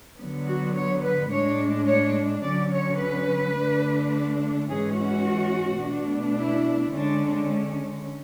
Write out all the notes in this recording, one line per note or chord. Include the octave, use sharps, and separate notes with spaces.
D3 F#3 B3
F#4
C#5
B4
A2 G#3 D4 C#5
C#5
D3 F#3 C#4 D5
C#5
B4
D3 A3 D4
G#2 E3 G#3 C#4 G#4
F#4
B2 A3 D4
E4
D3 G#3 C#4 D4